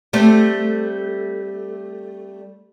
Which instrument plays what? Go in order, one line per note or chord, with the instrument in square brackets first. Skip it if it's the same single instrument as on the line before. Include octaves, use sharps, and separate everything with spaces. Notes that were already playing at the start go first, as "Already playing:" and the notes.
[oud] G3 A3 C4